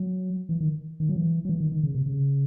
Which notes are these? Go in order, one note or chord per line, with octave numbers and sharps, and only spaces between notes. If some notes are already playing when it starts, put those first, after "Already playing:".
Already playing: F#3
E3
D#3
D#3
F#3
E3
F#3
E3
D#3
D#3
C#3
C3
C#3